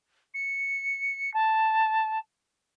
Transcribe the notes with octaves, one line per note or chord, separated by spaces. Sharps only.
C#7
A5